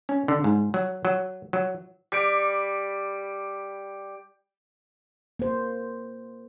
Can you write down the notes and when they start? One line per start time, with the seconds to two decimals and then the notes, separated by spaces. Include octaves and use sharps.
0.09 C#4
0.28 D3
0.44 G#2
0.74 F#3
1.05 F#3
1.53 F#3
2.12 G3 D6 G6 D7
5.39 A#3 C5